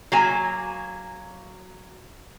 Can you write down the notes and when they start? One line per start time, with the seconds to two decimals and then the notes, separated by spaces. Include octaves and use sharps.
0.12 F#3 A#3 G#5